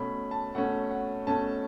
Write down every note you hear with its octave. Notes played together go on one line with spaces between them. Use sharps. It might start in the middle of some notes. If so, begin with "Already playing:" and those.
Already playing: B2 A3 C#4 B5
A5
B2 A3 C#4 F#5
F#5
B2 A3 C#4 A5